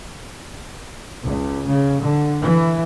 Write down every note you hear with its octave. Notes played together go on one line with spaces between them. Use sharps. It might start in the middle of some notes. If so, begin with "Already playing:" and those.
C#2
C#3
D3
E3